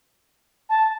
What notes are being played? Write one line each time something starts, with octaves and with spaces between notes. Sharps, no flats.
A5